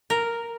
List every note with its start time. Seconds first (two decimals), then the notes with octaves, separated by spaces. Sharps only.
0.10 A#4